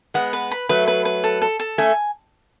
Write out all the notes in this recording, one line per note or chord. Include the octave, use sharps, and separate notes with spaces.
G#3 B3 F#5
B4
B5
F#3 A3 B4
B4
B4
A4
A4
A4
A3 C#4 G#5